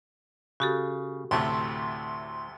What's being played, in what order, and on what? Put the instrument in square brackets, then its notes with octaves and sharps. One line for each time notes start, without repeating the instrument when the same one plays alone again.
[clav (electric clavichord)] C#3 [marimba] F#4 G4 A4
[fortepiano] D2 C3 A3 [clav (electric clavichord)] A2 [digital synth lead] C6